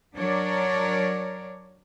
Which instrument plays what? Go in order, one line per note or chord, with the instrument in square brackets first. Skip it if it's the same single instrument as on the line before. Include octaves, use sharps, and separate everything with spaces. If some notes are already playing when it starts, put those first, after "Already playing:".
[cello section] F#3 D4 A#4 C#5 D5